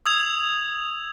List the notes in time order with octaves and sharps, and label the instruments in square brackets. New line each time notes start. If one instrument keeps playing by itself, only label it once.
[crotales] D#6 E6 G#6 F7